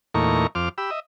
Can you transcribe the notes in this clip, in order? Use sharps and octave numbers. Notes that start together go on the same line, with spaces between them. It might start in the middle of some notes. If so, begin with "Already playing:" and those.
E2 A#2 A3 D#4 A#5 C#6
F2 C5 D6 F6
G4 B5 E6
D#5 E5